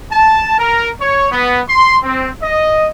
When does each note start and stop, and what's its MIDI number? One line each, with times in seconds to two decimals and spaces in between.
0.11 0.54 81
0.58 0.89 70
1.00 1.29 73
1.31 1.61 59
1.68 1.96 84
2.02 2.29 60
2.42 2.87 75